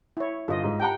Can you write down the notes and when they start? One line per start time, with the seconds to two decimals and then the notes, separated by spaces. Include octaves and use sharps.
0.17 E4 C#5
0.48 G1 F4 D#5
0.63 G#2
0.80 G4 F#5 G5 A5 A#5